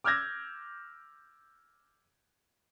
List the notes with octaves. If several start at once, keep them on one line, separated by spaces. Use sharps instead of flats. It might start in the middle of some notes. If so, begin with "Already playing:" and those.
D6 E6 F6 G6 G#6 A#6